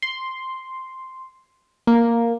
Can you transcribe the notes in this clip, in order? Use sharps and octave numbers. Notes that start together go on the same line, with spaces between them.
C6
A#3